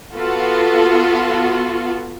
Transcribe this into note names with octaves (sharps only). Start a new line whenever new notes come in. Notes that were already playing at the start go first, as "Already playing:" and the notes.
B3 F4 F#4 A4